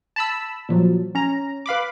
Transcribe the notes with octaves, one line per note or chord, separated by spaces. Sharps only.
A5 B5 E6
A#2 F3 F#3
C#4 A#5
B4 F5 B5 D6